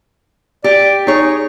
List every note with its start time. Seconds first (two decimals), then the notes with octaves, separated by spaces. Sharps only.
0.64 G4 D5
1.07 D#4 G#4 C#5